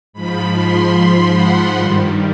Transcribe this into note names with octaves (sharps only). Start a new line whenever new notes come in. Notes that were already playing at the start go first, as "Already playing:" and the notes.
G#2 F3 B5
C6
B5
F#5
G2 D#3 G3